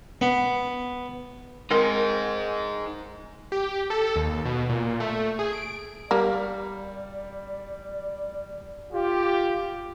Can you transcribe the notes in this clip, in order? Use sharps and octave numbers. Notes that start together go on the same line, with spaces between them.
B3
G#3 C4 D#4 G#4 A#4
G4
A4
D#2
B2
A#2
A3
G#4
D7
G3 A#3 D5
F4 G4